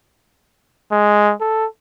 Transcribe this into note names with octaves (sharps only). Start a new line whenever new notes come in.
G#3
A4